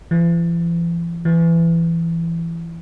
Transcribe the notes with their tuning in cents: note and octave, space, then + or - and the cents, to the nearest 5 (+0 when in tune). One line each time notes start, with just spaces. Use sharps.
E3 +45
E3 +20